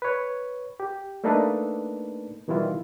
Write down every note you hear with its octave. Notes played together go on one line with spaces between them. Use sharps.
B4 C#5
G4
A3 A#3 D4 D#4 A4 B4
B2 D#3 E3 G3 E4 F4